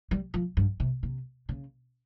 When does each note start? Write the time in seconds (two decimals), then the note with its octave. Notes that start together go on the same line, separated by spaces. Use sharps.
0.11 G3
0.34 F3
0.57 G2
0.80 C3
1.03 C3
1.49 C#3